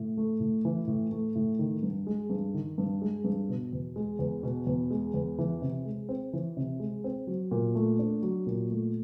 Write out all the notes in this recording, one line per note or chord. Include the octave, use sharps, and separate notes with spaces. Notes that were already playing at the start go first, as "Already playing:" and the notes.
Already playing: A2
A3
A2
E3
A2
A3
A2
D#3
G2
G#3
G2
D#3
G2
G#3
G2
B2
E2
G#3
E2
B2
E2
G#3
E2
E3
C3
G#3
C4
E3
C3
G#3
C4
F#3
A#2
A3
D4
F#3
A#2
A3